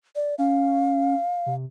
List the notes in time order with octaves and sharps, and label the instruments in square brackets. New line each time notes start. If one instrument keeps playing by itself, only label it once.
[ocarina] D5
[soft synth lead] C#4 [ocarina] F5
[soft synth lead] C3